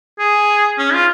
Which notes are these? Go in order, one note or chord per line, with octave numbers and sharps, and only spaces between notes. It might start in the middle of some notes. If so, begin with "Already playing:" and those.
G#4
C#4
F4